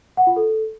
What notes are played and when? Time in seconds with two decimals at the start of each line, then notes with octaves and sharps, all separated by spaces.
0.17 F#5
0.27 F4
0.36 A4